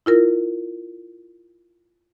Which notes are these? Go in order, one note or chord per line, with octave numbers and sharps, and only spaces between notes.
E4 F4 A#4